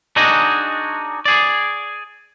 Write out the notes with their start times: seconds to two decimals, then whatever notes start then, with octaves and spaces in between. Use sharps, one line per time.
0.16 D4 D#4 F#4 G#4 D#5
1.26 G#4 D5